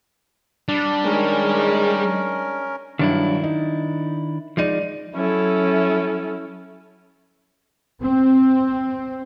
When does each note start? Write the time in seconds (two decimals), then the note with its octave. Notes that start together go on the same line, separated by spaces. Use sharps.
0.68 G3 D4
1.05 D#3 G#3 C#4 A#4
2.99 G2 D#3 F#3 D4 E4
3.43 D#4
4.57 F3 G#3 D#4 D5 D#7
5.14 F#3 C#4 E4 A4
8.03 C4